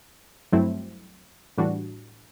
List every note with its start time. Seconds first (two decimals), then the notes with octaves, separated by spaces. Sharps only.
0.52 G2 F#3 A3 C4 E4
1.58 A2 E3 G3 D4 F#4